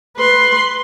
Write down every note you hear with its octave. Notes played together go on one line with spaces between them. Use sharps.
B4 C6